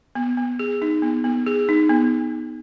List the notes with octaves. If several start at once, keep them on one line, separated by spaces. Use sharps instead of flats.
B3
B3
G#4
D#4
B3
B3
G#4
D#4
B3